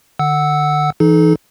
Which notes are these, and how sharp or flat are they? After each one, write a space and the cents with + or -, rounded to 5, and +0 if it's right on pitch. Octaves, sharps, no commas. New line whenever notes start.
D3 +35 F#5 +0 E6 -10
E3 +10 D#4 +0 A4 -35